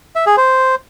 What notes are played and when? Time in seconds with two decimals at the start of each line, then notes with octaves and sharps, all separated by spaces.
0.16 E5
0.26 G#4
0.37 C5